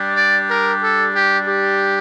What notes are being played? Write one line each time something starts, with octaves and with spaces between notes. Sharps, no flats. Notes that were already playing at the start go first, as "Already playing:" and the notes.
Already playing: G3 D4 G4
D5
A#4
A4
G4
G4